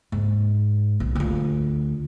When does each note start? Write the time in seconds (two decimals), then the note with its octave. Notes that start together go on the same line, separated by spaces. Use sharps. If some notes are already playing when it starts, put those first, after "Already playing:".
0.12 G#2
1.00 B1
1.15 D2 F4